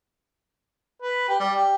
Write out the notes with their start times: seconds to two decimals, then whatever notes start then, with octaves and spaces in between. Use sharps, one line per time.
1.02 B4
1.29 G4
1.40 G3
1.56 G4